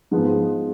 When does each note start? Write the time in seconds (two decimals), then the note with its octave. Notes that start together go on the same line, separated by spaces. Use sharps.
0.11 G#2 F3 G#3 B3